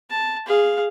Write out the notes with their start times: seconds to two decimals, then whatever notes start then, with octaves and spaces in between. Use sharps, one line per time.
0.10 A5
0.47 G#4 F5